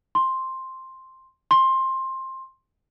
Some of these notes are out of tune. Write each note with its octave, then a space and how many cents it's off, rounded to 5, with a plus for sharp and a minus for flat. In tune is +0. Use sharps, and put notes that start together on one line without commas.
C6 +5
C6 +15